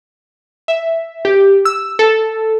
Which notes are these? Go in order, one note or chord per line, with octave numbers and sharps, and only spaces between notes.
E5
G4
E6
A4